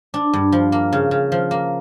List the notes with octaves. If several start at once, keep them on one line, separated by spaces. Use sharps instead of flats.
D4
G2
F3
A#3
C#3
C#3
F3
A#3